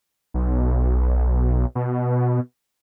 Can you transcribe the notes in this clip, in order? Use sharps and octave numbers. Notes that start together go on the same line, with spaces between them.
B1
B2